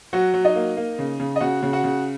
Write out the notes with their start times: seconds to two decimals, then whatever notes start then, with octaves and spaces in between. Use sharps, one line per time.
0.13 F#3 F#4 F#5
0.34 F#3
0.45 D#4 D#5
0.55 A#3
0.77 A#3
0.99 C#3
1.20 C#3
1.36 D#5
1.41 C#3 F#4 F#5
1.62 C#3
1.73 F#4 F#5
1.84 C#3